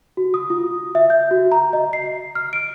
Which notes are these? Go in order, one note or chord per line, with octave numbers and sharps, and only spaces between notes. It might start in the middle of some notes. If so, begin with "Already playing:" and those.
F#4
D#6
F4
E5
G6
F#4
A#5
D#5
C7
F6
D7